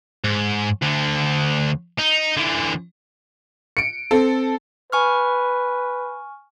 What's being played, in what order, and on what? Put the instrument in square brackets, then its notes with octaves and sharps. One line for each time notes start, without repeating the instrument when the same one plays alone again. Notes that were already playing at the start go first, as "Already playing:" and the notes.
[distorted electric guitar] G#2
D2 D3
D#4
D3 E3
[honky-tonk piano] C#7 D7
C4 A4
[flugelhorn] B4 [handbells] G#5 C#6 F6